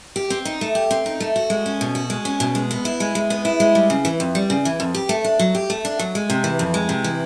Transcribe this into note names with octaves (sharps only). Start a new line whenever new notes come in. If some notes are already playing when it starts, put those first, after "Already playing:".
G4
C4
D#4
A3
G4
C4
D#4
A3
F#4
G#3
C#4
B2
F#4
G#3
C#4
B2
G#3
B3
E4
G#3
G#3
B3
E4
G#3
G3
C#3
E3
F2
G3
C#3
E3
F2
G4
A3
D4
F#3
G4
A3
D4
F#3
G#3
C3
E3
F2
G#3
C3
E3